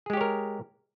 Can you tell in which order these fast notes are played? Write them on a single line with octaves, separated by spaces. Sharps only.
G#4 G#3 G4 C#5 A#4